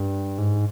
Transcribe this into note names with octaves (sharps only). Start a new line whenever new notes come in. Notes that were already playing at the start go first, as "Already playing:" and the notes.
Already playing: G2
G#2